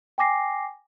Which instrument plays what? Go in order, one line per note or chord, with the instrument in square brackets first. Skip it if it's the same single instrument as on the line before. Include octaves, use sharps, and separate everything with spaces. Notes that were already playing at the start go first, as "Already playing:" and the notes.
[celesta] G5 G#5 D6 A#6 C7